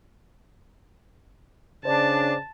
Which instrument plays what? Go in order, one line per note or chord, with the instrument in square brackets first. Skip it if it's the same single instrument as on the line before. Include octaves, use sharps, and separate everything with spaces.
[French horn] C#3 [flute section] D4 [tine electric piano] C5 D5 [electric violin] A5